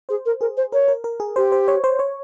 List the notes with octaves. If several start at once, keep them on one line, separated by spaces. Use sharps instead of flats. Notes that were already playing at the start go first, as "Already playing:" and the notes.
G#4 C5
A#4
G#4 A#4
C5
A#4 C#5
A#4
A#4
G#4
G4 C5
C5
C#5
C5
C#5